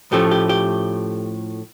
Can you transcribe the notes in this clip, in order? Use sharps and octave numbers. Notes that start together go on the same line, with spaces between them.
A2 F3 A3 C#4 G4
G4
G4